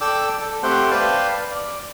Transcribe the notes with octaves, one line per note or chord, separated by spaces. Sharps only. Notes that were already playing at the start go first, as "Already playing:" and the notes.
A4 D5 G5 D6 E6
A4
A3 C4 G4 C5 F#5 G5
B4 D5 F5 G5 A5
D5